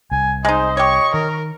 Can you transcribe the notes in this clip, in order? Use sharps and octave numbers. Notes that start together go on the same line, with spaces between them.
C2 G#5
G#3 D#4 C5 D#5
G4 C#5 C#6
D#3 A#4